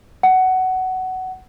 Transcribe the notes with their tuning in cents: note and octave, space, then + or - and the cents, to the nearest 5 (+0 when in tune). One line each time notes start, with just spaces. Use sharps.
F#5 +15